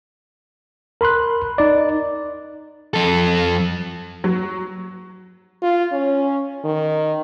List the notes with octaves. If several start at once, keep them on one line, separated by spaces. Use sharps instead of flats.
A#4 B5 C6 F#6
D#4 D5
F2 A4
F#3
F4
C#4
D#3